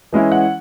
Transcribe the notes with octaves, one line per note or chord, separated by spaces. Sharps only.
E3 G#3 C#4 E4
F#5